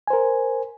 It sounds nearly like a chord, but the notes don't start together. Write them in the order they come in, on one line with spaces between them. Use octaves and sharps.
G#5 C5 A#4